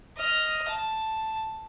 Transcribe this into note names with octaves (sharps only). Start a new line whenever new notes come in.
D#5 F6
A5